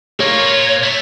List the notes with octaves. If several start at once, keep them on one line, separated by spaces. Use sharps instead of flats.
A#3 F4 C#5
A3